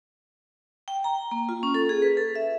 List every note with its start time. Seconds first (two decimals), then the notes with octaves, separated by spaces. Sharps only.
0.88 G5
1.04 A#5
1.31 A#3
1.49 F4
1.63 C#4
1.74 A4
1.89 G#4
2.02 B4
2.17 A4
2.35 E5